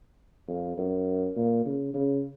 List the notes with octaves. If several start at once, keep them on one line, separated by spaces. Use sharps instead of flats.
F2
F#2
A#2
C#3
C#3